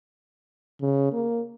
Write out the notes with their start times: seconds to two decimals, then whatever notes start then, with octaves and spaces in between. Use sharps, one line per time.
0.81 C#3
1.13 A#3